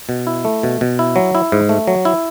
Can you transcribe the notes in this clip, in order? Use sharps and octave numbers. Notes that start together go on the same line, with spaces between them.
B2
E4
A3
B2
B2
E4
F#3
E4
G#2
A3
F#3
E4